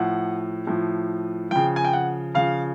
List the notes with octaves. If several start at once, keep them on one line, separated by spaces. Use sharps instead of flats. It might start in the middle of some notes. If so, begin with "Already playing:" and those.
Already playing: A2 F3 F#5
A2 F3
C#3 F3 G5
G#5
G5
F#5
C#3 F3 F5